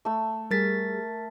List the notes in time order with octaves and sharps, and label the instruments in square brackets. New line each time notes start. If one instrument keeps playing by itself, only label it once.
[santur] A3 E6
[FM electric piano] G3 G#4 [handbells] A#4 A6 B6